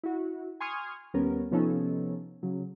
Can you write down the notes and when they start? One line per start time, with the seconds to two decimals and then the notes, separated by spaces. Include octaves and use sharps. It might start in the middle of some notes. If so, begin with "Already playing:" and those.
0.03 E4 F#4
0.60 G#5 C6 C#6 D#6 F6 G#6
1.14 D#2 G3 B3 C#4 A#4
1.51 C3 F3 B3 C#4 D#4 A4
2.43 C#3 F#3